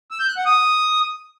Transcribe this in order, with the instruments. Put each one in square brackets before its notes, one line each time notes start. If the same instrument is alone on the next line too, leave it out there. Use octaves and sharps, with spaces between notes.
[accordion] E6
G6
F#6
F#5
D#6